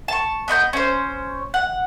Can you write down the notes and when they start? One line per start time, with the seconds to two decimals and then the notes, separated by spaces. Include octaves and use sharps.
0.08 A5 C#6
0.48 B3 D#5 A#5 G6
0.73 C#4 C5
1.54 F#5